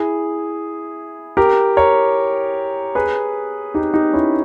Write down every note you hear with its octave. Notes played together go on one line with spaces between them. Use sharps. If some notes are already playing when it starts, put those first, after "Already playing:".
Already playing: E4 G#4
G4 A#4
A#4 C#5
G#4 B4
D#4 G4
D#4 G4
C#4 E4